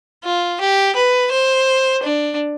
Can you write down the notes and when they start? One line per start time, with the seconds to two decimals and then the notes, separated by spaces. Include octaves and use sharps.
0.24 F4
0.61 G4
0.96 B4
1.32 C5
2.04 D4